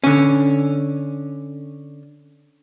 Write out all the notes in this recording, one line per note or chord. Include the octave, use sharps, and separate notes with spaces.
D3 C#4